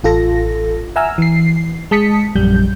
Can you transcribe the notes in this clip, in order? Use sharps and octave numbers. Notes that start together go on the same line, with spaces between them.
A1 F4 A4 A#6
E5 F#5 G#5 A#5 E6 F6
E3 C7
G#3 A5 D#6 B6 C#7
A#1 F#2 G3 G6